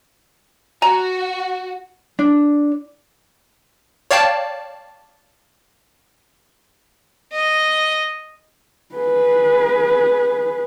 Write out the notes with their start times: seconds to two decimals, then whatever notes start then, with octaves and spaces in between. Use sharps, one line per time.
0.82 F#4 G#5 A#5
2.19 D4
4.11 C#5 D5 F5 G5 A5
7.33 D#5
8.95 G#4 B4